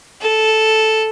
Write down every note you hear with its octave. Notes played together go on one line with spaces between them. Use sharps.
A4